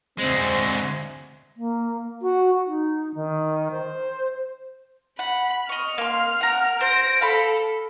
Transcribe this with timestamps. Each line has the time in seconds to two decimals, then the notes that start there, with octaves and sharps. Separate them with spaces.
0.19 D2 G#3 C4
1.56 A#3
2.22 F#4
2.67 D#4
3.15 D#3
3.71 C5
5.19 F#5 B5
5.69 D#5 C#6 F6
5.98 A#3 C6
6.41 A#4 F#5
6.81 C5 A#6 D7
7.21 A4 F5 B5